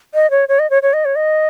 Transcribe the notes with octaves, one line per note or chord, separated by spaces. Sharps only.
D#5
C#5
C#5
D#5
C#5
C#5
D#5
C#5
D#5